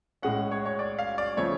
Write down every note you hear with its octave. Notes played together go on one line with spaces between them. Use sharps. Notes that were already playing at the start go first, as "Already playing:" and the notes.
A2 G#3 C#4 F#5
C#5
C#5
D5
F5
D5
C#3 F3 A3 C#5